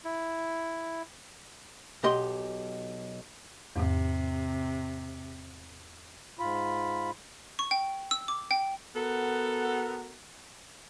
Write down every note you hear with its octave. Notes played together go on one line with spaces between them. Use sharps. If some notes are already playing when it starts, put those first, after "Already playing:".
E4
B1 G4 D#5 C6
E2 G#2 C3
G#2 F4 B5
C#6
G5
E6
D6
G5
B3 F#4 A4 A#4